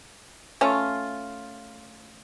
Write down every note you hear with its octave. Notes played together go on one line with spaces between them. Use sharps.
A3 C#4 F4